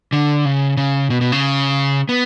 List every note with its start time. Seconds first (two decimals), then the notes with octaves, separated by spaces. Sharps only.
0.13 D3
0.45 C#3
0.77 C#3
1.10 B2
1.21 B2
1.32 C#3
2.09 B3